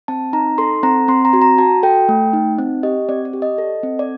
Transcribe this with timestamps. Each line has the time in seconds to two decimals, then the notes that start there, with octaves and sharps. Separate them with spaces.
0.08 C4 A5
0.33 D#4 A#5
0.58 A4 C6
0.83 C4 A#5
1.08 C4 C6
1.25 A#5
1.33 F#4
1.42 A#5
1.58 F#4 A5
1.83 A4 G5
2.09 A3
2.33 D#4
2.59 C4
2.83 G4 D#5
3.09 C4 D5
3.25 D5
3.33 G4
3.42 D#5
3.58 A4
3.83 C4
3.99 D5